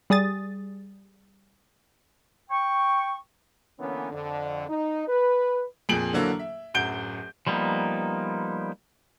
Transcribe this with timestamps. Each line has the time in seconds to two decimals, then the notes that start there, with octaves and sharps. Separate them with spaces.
0.10 G3 G#4 D#6 A6
2.50 G5 C#6
3.79 D3 E3 A#3 B3 C#4
4.12 F2 D3
4.69 D#4
5.08 B4
5.89 F2 A#2 G#4 D7 F#7
6.13 D3 E3 F#3 A#3 E4 A4
6.39 E5
6.74 D1 F#2 F#5 G6 D7 G7
7.47 F3 G3 A#3 B3 D#4